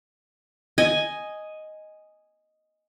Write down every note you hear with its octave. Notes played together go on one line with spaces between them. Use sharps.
D#5 G#5